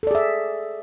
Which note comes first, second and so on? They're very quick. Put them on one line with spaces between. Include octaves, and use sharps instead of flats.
A4 D5 G#4 E5